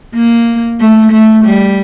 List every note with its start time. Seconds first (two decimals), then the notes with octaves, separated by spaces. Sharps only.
0.15 A#3
0.80 A3
1.12 A3
1.45 G3